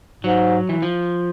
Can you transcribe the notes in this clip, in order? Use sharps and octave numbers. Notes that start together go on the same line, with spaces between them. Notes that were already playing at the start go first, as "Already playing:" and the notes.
G#2 F#3
E3
F3